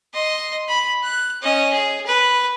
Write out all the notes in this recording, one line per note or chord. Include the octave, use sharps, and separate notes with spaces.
D#5 C6
B5
F#6
C#4 D#5
G#4
B4